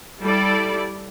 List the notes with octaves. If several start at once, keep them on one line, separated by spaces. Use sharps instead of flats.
G3 E4 A4 D5